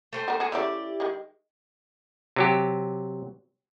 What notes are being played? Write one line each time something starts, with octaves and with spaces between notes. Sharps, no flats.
A3 C5 G5
F#4 A#4
F#4 G#4
C#3 A3 E4 G4 D5
D#3 G#3
C3 F#3 G4